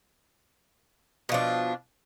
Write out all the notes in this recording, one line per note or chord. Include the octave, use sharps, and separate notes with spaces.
B2 F3 D4